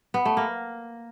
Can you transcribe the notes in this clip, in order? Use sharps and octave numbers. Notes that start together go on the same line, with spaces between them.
B3
A3
A#3